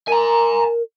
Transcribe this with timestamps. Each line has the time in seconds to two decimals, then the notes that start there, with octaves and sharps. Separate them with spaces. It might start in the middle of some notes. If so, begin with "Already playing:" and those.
0.08 A#4 G#5 A#5